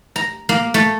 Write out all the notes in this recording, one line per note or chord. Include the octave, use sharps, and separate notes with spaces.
A#5
A#3
A3